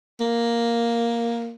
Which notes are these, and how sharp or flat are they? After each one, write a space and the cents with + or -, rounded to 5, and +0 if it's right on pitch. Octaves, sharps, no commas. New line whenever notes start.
A#3 +0